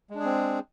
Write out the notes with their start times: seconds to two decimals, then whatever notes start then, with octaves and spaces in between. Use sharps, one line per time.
0.10 G#3
0.15 D4
0.20 G#4
0.25 C4